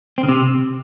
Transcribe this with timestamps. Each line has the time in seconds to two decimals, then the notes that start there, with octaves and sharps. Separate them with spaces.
0.18 C4
0.23 C#3
0.29 C3